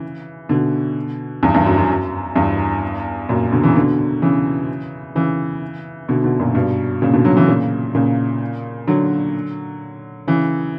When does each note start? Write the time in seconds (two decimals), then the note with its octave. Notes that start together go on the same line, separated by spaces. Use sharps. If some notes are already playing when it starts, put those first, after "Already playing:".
Already playing: C#3 E3
0.49 B2 D3
1.43 E2 G2
1.54 E2 G2
1.66 F#2
1.78 F#2
1.89 F#2
2.35 E2 G2
3.29 F#2 A#2
3.52 B2 D3
3.63 C#3 E3
3.75 B2 D3
4.22 C#3 E3
5.15 C#3 E3
6.09 B2 D3
6.24 B2 D3
6.39 F#2 A#2
6.55 G2 B2
7.02 A#2 C#3
7.13 B2 D3
7.25 D3 F#3
7.37 C#3 E3
7.48 A#2 C#3
7.95 A#2 C#3
8.88 D3 F#3
10.27 C#3 E3